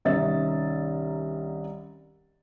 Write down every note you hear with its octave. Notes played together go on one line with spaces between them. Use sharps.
C2 D#3 C#4 D#5 E5 A6